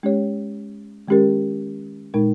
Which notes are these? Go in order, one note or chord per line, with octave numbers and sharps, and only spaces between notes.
G#3 C#4 G4 C#5
D#3 G#3 C#4 G4 A#4
A#2 G#3 D#4 A#4